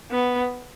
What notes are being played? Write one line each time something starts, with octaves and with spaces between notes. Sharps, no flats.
B3